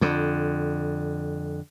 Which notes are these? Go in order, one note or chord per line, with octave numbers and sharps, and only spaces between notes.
F2 D3